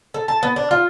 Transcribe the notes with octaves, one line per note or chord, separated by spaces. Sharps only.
A4
A5
B3
D4
F4